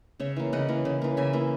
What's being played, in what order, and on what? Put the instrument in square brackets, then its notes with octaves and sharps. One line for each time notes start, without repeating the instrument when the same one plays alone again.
[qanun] C#3 C#5 E5
E3 A#3
C#3 D#5 F#5
E3 A#3
C#3
E3 A#3
C#3 E5 G#5
E3 A#3